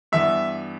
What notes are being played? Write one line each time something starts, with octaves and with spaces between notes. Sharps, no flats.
G2 E3 B3 E5